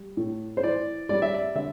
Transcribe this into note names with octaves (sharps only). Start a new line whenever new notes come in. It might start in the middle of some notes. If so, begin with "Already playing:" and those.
Already playing: G3
A2
C5
E3 D5
G3 D5
E5
D5
D3 E5